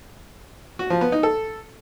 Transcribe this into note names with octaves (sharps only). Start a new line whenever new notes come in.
F#4
F3
B3
D#4
A4